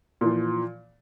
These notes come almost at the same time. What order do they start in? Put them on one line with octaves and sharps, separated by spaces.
A#2 E3 F3